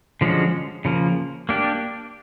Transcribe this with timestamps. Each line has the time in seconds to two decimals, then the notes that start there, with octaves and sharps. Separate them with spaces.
0.21 D3 F3 G#3 C#4 F#4
0.85 C#3 F3 A#3
1.49 A#3 D4 G4